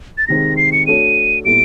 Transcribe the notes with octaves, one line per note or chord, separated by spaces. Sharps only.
A6
C3 D#3 G#3 C4 A#6
C7
C#7
A3 D4 F#4 A4 C#5 D#7
A#2 G3 B3 E4 A4 D7